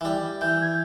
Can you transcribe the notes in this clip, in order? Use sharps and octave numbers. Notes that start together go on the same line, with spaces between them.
E3
G3
E3 G6
G#6
G6